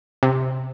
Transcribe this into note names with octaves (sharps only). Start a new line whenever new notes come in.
C3